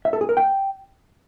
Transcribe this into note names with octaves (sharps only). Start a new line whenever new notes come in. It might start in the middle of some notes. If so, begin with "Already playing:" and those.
E5
A4
G#4
A#4
G5